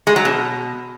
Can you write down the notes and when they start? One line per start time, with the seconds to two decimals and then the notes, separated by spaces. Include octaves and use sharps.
0.07 G#3
0.16 F#3
0.25 B2